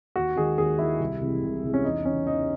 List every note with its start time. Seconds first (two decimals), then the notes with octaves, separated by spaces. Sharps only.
0.16 D#2 F#4
0.36 D#3 G#3 G#4
0.58 D#2 G#4
0.79 D#3 G#3 E4
0.99 C2
1.21 C3 E3 G#3
1.42 C2
1.64 C3 E3 G#3
1.74 C#4
1.84 E2 D#4
2.05 C#3 E3 C#4
2.27 E2 D#4